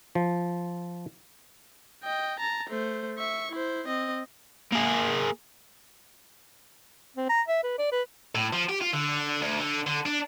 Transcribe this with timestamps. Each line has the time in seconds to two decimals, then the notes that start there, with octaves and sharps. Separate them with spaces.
0.15 F3
2.04 D#5 G5
2.40 A5 A#5
2.69 A3 C5
3.18 E5 C#6
3.52 E4 C5
3.87 C4 D#5
4.72 A#3 G#4
7.16 C4
7.29 A#5
7.48 E5
7.63 B4
7.79 D5
7.92 B4
8.35 A2
8.53 F3
8.69 G4
8.81 F4
8.94 D3
9.42 D2
9.60 D3
9.87 D3
10.06 D4